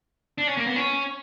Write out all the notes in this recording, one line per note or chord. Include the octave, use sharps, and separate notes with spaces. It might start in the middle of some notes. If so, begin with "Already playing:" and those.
D4
C#4
A#3
B3
C#4